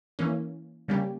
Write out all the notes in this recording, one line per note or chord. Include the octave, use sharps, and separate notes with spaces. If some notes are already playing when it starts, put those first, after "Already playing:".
E3 A#3 C#4
C#3 G3 A#3 C#4 G4